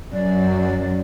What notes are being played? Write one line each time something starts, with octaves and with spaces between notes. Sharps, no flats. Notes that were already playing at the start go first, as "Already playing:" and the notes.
F#2 D5